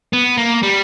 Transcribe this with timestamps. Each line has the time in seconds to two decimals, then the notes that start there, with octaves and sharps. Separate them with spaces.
0.13 B3
0.37 A#3
0.63 G3